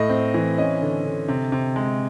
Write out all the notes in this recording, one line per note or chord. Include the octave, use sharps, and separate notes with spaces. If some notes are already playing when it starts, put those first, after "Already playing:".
Already playing: A2 D#5
C4
E3
C#4 D#5
D3
D3
C3
C3
G#3